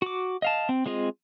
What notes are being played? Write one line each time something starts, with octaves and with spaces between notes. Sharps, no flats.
F#4 D6
D#5 F5 A5
C4
G#3 C4 F4 G#4 D#5